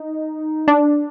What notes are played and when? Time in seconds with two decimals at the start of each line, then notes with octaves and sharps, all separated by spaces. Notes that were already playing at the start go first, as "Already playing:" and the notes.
Already playing: D#4
0.68 D4